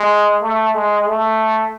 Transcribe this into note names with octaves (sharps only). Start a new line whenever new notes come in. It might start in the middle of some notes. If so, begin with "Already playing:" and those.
Already playing: G#3
A3
G#3
A3